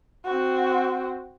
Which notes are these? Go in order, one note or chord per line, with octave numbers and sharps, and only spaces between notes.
C4 F#4